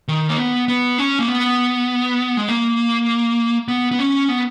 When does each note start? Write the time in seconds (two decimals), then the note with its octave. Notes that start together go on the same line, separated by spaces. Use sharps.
0.08 D#3
0.29 A#3
0.38 B3
0.68 B3
0.98 C#4
1.19 A#3
1.28 B3
2.37 G#3
2.49 A#3
3.68 B3
3.91 B3
3.99 C#4
4.28 B3